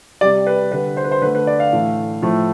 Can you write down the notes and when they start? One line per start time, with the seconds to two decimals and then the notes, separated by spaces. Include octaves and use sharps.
0.21 C3 G3 D5
0.47 B4
0.71 D3 G3 B4
0.97 C5
1.04 B4
1.11 C5
1.22 D3 B4
1.25 A3
1.35 B4
1.47 D5
1.60 F5
1.72 A2 E3 A3
2.22 A2 F3 A3